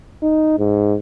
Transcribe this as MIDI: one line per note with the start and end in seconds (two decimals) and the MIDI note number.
0.22 0.55 63
0.59 0.97 44